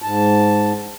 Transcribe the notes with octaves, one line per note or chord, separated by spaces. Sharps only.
G#2 A5